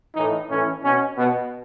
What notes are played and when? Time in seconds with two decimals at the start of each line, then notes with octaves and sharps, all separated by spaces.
0.14 A2 E3 D#4
0.49 A2 E3 C#4
0.83 B2 C#4
1.17 B2 B3